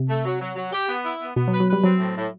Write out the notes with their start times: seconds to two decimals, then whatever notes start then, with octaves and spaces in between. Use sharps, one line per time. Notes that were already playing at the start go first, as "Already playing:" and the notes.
Already playing: C3
0.09 A3
0.25 F#3
0.40 F#3
0.56 F#3
0.73 G4
0.89 B3
1.04 E4
1.21 B3
1.36 B2 B3
1.48 F#3
1.52 B4
1.60 F#3
1.68 G3 B4
1.84 F#3 C4
1.99 A2
2.16 A2